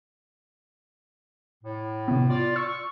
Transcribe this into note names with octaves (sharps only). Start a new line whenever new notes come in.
A2
C3 B3
F4 D5
C#6 E6